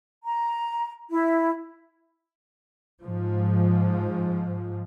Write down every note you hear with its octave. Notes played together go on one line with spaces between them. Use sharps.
A#5
E4
G#2 F3